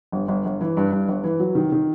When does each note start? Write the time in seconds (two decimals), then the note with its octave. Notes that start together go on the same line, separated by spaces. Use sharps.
0.12 G1
0.28 G1
0.45 G1
0.61 E3
0.77 G2
0.92 G2
1.08 G1
1.24 E3
1.40 F#3
1.55 D#3
1.72 D#3